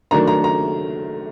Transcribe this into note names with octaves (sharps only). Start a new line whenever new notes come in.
D#3 F#3 A3 D4 A#5
A#5
A#5